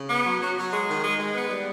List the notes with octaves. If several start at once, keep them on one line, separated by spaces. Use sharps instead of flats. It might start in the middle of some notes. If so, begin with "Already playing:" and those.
Already playing: C#3
B3
F#3
F#3
F#3
G#3
D#3
G#3
G#3
B3
G3